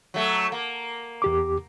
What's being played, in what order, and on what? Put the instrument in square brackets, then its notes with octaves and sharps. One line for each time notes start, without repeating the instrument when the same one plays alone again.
[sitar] F#3 A3
A#3
[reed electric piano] E2 G4 D6